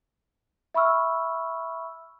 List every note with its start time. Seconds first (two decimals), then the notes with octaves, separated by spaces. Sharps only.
0.74 E5 B5 C#6 E6 F6